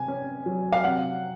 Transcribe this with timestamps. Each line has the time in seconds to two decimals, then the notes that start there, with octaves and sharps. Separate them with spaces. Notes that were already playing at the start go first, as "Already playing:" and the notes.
Already playing: C3 G#5
0.08 C#4
0.46 F#3
0.72 F5
0.84 C3 F#5